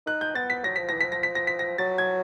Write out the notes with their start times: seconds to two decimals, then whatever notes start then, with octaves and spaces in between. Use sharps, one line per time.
0.07 D#4 F#6
0.21 G6
0.35 B3 A6
0.50 B6
0.64 F#3 A#6
0.76 F3 B6
0.89 E3 A#6
1.01 F3 B6
1.12 A#6
1.23 B6
1.35 A#6
1.47 B6
1.59 A#6
1.78 F#3 A6
1.98 G#6